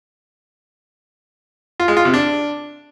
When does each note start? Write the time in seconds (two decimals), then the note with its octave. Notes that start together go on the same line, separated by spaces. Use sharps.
1.80 F4
1.88 G#3
1.97 F4
2.05 C3
2.14 D4